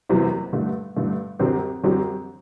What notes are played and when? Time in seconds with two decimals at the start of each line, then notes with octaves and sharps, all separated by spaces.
0.09 F#1 E2 C3 F#3 B3
0.53 G2 D3 A3
0.97 G2 D3 A3
1.39 F#2 D3 F#3 C4 G4
1.84 F#2 D3 F#3 C4 G4